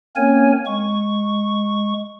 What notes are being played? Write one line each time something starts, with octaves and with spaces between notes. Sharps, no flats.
A#3 C4 C#4 A#4 C#5 G#5
G#3 C#6